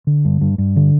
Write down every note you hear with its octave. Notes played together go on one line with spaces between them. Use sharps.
D3
G2
G2
G2
D3